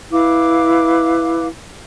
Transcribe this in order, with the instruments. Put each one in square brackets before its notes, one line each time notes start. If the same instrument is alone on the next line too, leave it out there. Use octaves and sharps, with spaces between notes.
[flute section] E4 B4 F5 D6